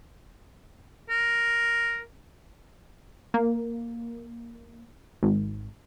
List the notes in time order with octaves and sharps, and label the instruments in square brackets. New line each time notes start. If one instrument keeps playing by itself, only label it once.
[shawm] A#4
[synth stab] A#3
G#1